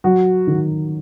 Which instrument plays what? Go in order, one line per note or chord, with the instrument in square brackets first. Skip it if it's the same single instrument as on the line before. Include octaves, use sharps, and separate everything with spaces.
[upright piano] F#3 [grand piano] F#4
[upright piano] D#3